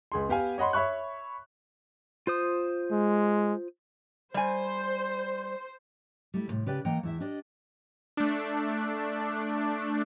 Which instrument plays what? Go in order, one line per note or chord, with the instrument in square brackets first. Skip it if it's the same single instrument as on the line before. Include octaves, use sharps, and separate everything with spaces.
[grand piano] C#2 G#4 C6
B3 G4 F5 G#5
C#5 D#5 F#5 B5 C6
C#5 E5 B5 C#6 F#6
[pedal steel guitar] F4 C5 D#6
[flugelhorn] G#3
[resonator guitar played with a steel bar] G3 G#5 [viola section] C5
[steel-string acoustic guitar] G3 A3 E4
D#2 A2 C3
C#3 G4 B4 D5 G5
E3 A#3 D#5 F#5 G5 A#5
E2 E4 E5
D4 G4 D5 D#5
[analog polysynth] A3 D4